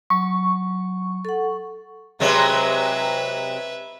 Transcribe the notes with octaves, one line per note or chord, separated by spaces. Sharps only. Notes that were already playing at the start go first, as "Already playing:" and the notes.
F#3 C#6
A4 F#5
C3 F#3 G#3 B4 E5